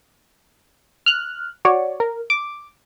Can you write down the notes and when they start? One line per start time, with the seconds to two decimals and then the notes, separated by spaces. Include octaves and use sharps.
1.06 F6 F#6
1.65 F#4 C#5 D5
2.00 A#4
2.30 D6